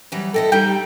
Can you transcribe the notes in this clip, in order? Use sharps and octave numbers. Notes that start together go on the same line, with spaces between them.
E3 F#3 G3
E4 A4 D#5 G5
G3 D#4 G4 G5